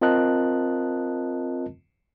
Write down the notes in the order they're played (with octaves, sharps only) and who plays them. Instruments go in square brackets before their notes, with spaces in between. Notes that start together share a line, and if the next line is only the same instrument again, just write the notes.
[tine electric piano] C4 F4 A#4 D#5 A5 F#6